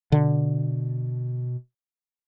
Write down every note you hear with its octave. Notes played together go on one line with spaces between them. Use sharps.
B2 D3